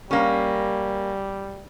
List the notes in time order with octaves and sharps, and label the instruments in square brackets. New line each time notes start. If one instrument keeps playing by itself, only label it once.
[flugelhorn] G3 [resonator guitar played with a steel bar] A#3 C#4